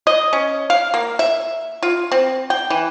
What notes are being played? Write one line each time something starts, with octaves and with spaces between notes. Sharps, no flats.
D#5
C#4
F5
A#3
E5
F4
C4
G5
E3